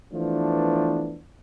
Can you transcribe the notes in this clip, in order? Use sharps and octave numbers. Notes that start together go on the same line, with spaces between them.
E3 F3 A3 B3 D4